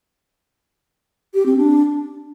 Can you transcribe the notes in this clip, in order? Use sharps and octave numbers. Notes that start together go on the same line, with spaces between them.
G4
C4
D4